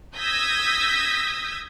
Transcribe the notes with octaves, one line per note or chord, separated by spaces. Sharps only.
D#6 E6 G6 G#6 A#6 B6